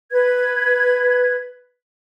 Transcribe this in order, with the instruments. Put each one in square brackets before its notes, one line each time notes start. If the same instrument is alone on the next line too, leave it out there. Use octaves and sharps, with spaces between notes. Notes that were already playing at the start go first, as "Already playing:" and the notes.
[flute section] B4 G#6